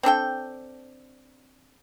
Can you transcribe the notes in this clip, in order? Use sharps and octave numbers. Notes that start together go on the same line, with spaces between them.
C4 D4 A4 G5